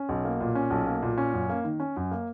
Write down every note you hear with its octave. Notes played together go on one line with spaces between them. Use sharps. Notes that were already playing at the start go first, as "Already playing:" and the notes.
Already playing: C#4
B1
A#3
A#2
C#4
B1
A#3
A#2
C#4
F#2
A#3
D#3
C#4
F#2
A#3